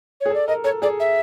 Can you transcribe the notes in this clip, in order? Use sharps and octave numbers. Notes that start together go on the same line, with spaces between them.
G#4 C#5
A4 D5
A#4 D#5
A4 C#5
G#4 D5
E5